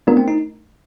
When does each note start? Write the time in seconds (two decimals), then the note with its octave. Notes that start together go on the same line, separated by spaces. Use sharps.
0.07 A3 B3 D4 F4 A#4
0.17 C4
0.28 D#4